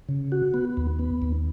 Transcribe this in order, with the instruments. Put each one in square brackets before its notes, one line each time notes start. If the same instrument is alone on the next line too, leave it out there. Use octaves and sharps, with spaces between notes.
[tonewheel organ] C#3
F#4
B3
D#2
B3
D#2